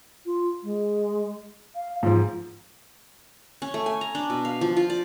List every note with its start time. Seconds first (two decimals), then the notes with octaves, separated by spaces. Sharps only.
0.26 F4
0.64 G#3
1.76 F5
2.03 G#2 F3 F4
3.62 C#4
3.74 A3
3.86 G#5
4.01 A#5
4.15 D4
4.30 B2
4.45 F5
4.61 F3
4.77 F4
4.90 D5